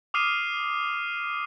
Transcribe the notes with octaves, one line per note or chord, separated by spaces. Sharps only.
D6 D#6 F6 C7 D#7